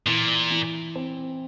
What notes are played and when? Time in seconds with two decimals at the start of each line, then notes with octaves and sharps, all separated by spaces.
0.06 A#2 E3
0.51 E3
0.95 C4